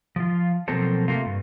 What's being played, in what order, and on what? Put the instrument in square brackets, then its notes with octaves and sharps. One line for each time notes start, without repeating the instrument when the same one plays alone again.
[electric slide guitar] F3 F4
B2 F3 F#3 A#3 C4 A4
C3 A3 A#3 F4
G2